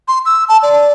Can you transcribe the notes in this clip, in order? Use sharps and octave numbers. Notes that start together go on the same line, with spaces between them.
C6
E6
A5
D5